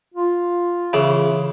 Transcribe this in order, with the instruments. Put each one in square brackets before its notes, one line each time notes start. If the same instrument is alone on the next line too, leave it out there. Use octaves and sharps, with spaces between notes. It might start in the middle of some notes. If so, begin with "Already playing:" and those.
[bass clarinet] F4
[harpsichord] C#3 E3